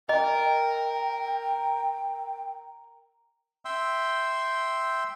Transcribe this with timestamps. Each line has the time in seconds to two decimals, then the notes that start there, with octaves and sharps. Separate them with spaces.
0.09 A#4 D#5 G5
3.65 E5 G5 C6 E6